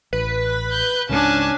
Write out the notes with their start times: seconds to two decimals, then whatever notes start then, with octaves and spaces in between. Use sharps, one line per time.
0.13 A1 B4
0.71 F#6 G6
1.09 C#2 G#2 C#3 C#4 D4 G#5 A5